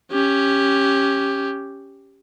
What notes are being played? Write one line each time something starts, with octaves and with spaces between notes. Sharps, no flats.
C#4 G4